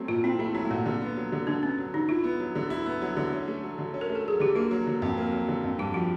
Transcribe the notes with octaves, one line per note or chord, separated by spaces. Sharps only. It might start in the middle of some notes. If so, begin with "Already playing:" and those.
Already playing: F#3 A3 C4
A#2 F4
C4 E4
A3 E4
F#3 E4
A3
A#2 A#3
D3
B3
F#3
D3
D3 D4
B3 C#4
F#3
D3 D#4
E4 F4
B3
F#3
D3
E4
B3
F#3
D3
C#4
A3
F#3
D3
C#4
A#4
A3
A4
F#3 G#4
D3 G4
A#3 F#4
F#3
D3
F2
A#3
F#3
D3
F2
G2 F#4
F3 F#4